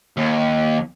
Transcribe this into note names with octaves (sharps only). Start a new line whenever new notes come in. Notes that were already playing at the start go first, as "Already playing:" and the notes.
D#2